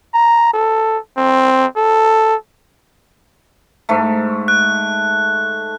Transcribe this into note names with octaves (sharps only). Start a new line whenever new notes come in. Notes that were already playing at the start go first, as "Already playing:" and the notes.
A#5
A4
C4
A4
G#2 A3
F#6